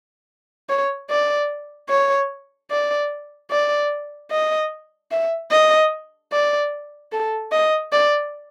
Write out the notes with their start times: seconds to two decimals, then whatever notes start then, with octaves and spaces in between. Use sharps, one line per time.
0.69 C#5
1.10 D5
1.89 C#5
2.71 D5
3.50 D5
4.31 D#5
5.11 E5
5.51 D#5
6.32 D5
7.12 A4
7.52 D#5
7.92 D5